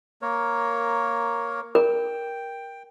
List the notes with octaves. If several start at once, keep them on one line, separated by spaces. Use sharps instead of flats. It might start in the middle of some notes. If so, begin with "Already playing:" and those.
A#3 A#4 C#5
A#4 G5